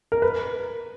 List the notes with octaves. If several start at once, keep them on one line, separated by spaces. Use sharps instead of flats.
A#4
B4